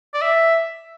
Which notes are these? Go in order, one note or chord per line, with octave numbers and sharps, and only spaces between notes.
D5
E5